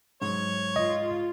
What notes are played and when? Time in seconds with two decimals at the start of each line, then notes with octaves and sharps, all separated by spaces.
0.21 G#2 F#3 C#5
0.76 F4 D#5